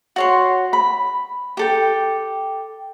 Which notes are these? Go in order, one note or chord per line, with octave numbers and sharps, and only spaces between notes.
F#4 C#5 C6
B5
G4 A4 G5